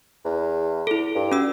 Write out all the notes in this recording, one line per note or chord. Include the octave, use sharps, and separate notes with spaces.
E2
E4 A4
G2
C#4 F#4 E6